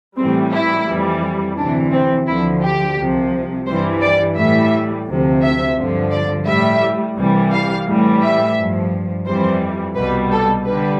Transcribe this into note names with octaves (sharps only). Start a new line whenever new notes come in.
A2 E3 G3 C4
E4
F2 E3 G3
D2 C3 E3 D4
C4
D2 D3 F3 E4
G4
C2 C3 F3
G2 E3 G3 C5
D5
A2 E3 G3 E5
D2 C3 F3
E5
G2 D3 F3
D5
A2 G3 E5
C2 C3 E3 G3
F5
A2 E3 G3
E5
G2 F3
F2 E3 G3 C5
C2 B2 G3 B4
A4
D3 G3 B4